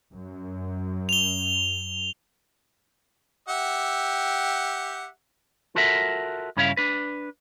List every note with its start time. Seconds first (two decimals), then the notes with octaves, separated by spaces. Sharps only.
0.11 F#2
1.09 F7 G7
3.49 G4 E5 F#5
5.75 F4 F#4 A4 A#4 E5 F#5
6.57 G2 C#3 C#4 E4 A4 F5
6.77 D4 B4